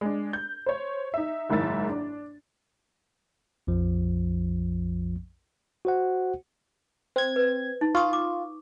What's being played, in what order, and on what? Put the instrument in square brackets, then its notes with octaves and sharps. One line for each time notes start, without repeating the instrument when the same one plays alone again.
[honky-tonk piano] G#3 D4
G6
C5 C#5
D#4 E5
F#1 G#2 D#3 E4 E5 A6
D4
[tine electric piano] A#1 F2 F3
F#4 C5 F#5
[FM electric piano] C4 G#6 [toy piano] C5
[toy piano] B4
D#4
[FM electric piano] F4 [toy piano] C#6 D#6
[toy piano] D6